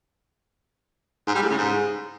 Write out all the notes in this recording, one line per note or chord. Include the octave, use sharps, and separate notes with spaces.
G#2
G3
A2
C#3
G#2